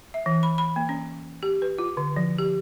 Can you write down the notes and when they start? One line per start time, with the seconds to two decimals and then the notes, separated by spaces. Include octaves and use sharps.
0.14 E5
0.26 E3
0.43 B5
0.58 B5
0.76 A#3
0.89 C#4
1.43 G4
1.62 B4
1.78 F4
1.97 D3
2.16 F3
2.38 G4